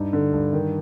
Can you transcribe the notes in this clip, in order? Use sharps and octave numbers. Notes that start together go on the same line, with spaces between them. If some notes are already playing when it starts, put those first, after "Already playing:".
Already playing: G2 D#4
D3
G2
D#3